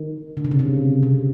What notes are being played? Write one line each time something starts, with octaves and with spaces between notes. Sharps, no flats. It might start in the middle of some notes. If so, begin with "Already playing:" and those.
Already playing: D#3
D3
C#3
C3
C#3
C3